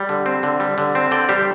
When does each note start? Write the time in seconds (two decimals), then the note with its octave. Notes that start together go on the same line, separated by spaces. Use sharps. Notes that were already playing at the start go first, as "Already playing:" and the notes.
Already playing: G3
0.09 D3
0.26 C4
0.43 D3
0.60 G3
0.78 D3
0.95 C4
1.11 D3 D5 G5
1.29 G3 G4 C5